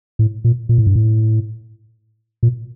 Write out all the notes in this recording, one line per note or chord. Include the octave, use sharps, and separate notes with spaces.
A2
A#2
A#2
A2
G2
A2
A#2